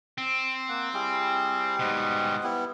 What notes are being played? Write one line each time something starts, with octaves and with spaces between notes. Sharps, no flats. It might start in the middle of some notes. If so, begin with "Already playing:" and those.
C4
A#3 F#5
G3 E4 G#4
G#2 B2 C5 D#5 F#5
G3 B3 E4